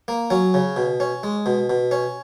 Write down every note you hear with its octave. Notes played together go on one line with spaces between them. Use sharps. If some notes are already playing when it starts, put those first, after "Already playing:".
A#3
F#3 C#4
C#3
B2
C#4
G#3
B2
B2
C#4